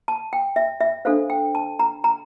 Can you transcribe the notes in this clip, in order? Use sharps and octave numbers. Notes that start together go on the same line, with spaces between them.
A5
G5
E5
E5
D4 A4 C5 F5
G5
A5
A#5
A#5